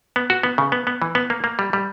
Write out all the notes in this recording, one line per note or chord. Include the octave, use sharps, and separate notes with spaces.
B3
F#4
B3
C#3
B3
B3
E3
B3
A#3
A#3
G3
G3